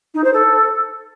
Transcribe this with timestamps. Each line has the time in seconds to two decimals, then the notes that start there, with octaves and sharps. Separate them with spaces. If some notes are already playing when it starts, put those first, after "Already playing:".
0.14 D#4
0.24 C5
0.33 A4